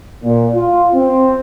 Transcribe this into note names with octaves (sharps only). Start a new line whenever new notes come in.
A#2
F4
C4